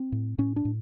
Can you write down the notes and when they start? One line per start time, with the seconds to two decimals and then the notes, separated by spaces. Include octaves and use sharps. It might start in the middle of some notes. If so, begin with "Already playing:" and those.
Already playing: C4
0.12 A2
0.38 A2 C#4
0.56 D4
0.65 A2